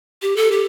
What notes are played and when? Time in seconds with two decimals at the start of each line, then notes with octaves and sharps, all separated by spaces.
0.22 G4
0.36 A4
0.52 G4